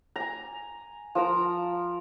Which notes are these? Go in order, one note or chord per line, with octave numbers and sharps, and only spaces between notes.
G#5 A#5
F3 A#4 A#5